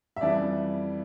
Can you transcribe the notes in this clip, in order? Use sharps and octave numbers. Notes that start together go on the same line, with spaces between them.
E5
F2 E3 G3 D5